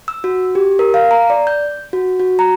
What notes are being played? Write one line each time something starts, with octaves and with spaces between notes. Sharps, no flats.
E6
F#4
G4
A#4
F5
A#5
D5
G6
F#4
F#4
A#5